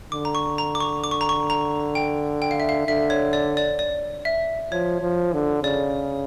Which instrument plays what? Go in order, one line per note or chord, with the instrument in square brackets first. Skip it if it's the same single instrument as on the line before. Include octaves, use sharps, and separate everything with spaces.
[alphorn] D3 [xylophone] D6
[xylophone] A#5
C#6
A#5
D6
C#6
D6
C#6
A#5
C#6
A#5
G5
G5
F5
E5
F5
[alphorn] D3 [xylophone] E5
[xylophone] C#5
D5
D5
D5
E5
[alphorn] F3 [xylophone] C#5
[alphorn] F3
D3
[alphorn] C#3 [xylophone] D5